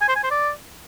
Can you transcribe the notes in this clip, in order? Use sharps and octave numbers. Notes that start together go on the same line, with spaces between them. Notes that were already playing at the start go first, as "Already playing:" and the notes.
G#5
C5
G#5
C5
D5